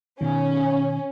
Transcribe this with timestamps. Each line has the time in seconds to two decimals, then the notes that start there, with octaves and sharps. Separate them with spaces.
0.21 B2 D#3 C#4